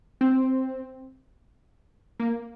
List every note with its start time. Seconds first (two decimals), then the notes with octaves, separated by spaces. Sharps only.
0.21 C4
2.20 A#3